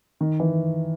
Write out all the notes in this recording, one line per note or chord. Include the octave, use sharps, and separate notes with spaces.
D#3
E3